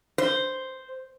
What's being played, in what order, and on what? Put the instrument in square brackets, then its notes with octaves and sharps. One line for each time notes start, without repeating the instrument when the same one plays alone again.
[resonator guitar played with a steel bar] C5